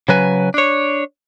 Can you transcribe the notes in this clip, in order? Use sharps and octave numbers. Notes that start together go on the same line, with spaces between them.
C#3 F#3 B4 G#5
D4 C#5